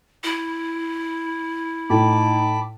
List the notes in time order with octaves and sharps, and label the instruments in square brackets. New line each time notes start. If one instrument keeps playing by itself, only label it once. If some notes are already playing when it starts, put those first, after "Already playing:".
[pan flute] E4
[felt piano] A2 [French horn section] D#4 [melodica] A5 B5 D6